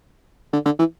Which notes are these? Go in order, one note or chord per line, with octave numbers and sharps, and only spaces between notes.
D3
D3
E3